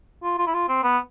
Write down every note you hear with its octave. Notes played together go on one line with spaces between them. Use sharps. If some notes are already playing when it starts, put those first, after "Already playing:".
F4
F4
E4
F4
C4
B3